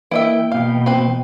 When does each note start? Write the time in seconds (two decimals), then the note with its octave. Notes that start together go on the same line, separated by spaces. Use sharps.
0.11 E3 A#3 E4 A#4 D#5 E5 G5
0.52 B2 B3 F5
0.86 C4 B4